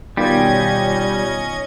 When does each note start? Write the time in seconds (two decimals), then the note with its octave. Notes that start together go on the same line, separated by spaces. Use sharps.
0.17 B2 D#3 G3 C#4 F4 D#5 G#6